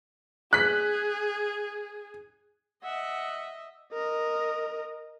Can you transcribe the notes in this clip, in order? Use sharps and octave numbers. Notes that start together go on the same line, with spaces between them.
G#4 F#6 B6
D#5 E5 F#5
A#4 D#5